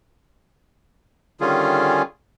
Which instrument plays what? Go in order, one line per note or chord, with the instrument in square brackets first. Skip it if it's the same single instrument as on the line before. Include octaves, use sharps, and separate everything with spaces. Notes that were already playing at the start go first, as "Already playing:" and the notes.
[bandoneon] D3 D#3 G3 C#4 F4 G#4